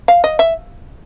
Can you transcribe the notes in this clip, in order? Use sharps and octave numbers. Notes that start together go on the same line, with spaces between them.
F5
D#5
E5